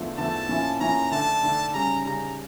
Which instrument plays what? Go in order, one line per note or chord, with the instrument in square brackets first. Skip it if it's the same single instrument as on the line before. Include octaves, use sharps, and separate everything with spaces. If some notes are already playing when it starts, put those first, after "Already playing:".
Already playing: [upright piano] E2 D3 F3 A3
[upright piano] E2 D3 F3 A3 [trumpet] A5
[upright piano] A#2 F3 C#4 E4
[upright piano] A#2 F3 C#4 E4 [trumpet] A#5
[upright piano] D3 A3 D4 [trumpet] A5
[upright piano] D3 A3 D4
[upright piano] C#3 G3 C#4 [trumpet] A#5
[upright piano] C#3 G3 C#4 [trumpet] A#5